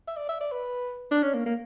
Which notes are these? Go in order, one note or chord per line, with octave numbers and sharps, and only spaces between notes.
E5
D5
E5
D5
B4
D4
C#4
A#3
A#3